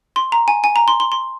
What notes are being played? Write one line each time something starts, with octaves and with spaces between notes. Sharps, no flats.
C6
A#5
G#5
G#5
A#5
C6
C6
C6